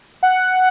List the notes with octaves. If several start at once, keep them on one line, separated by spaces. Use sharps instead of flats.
F#5